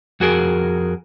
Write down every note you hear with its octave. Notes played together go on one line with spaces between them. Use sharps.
F2 F#4 G#4 A#4